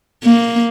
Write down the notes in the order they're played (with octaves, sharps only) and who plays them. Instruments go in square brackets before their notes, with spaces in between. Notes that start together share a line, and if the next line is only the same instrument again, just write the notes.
[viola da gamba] A#3